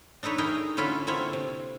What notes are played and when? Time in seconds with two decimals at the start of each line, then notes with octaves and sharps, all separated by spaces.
0.23 D4 D#4 A4 B4 C#5
0.38 D#4 E4 G#4 A#4 G5
0.77 D3 C#4 E4 F4 A4 B4
1.07 D3 A#3 C4 E4 F4 C#5
1.33 C3